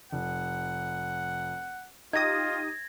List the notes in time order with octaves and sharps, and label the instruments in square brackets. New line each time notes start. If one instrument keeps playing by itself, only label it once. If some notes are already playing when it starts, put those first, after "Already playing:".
[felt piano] F1 [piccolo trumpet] F#5
[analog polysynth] D#4 G4 D#6 [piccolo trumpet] F4 [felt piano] D#5 [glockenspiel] G#6 A#6